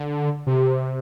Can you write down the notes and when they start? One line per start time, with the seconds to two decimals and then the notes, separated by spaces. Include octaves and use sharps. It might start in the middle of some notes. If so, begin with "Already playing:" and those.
Already playing: D3
0.47 C3